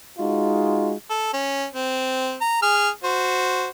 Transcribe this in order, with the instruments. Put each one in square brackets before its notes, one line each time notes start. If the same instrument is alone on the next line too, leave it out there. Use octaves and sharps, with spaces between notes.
[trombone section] G#3 D#4 F4 F#4
[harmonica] A4
C#4
C4
A#5
G#4 F6
F#4 C5